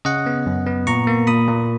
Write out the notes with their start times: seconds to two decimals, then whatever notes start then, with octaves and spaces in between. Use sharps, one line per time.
0.05 C#3 D#5 F#5
0.26 B3
0.46 F#2
0.67 B3
0.87 A#2 A#5 C#6
1.07 A#3
1.27 A#2 B5 D#6
1.48 A#2